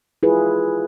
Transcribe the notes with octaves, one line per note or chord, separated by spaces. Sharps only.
E4 F4 G#4 B4